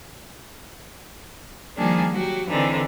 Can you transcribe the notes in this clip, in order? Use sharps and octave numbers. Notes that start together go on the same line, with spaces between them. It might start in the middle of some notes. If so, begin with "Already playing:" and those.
D#3 F3 G3 A#3 D4 G#4
F#3 F#4 G4
D3 E3 C4 D4 D#4 G#4